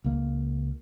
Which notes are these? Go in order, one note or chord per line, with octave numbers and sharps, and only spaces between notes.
C#2 A#3